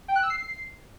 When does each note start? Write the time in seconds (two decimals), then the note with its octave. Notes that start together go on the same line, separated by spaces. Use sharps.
0.08 G5
0.16 F#6
0.23 E6
0.30 C7